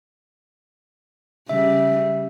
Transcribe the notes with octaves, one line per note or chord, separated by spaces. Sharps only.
C#3 G3 E5